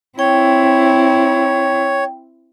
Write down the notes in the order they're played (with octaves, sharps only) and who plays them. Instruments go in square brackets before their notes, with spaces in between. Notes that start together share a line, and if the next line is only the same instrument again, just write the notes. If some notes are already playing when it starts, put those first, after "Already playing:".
[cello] C4 E4 [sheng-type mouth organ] C#5 [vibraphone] G5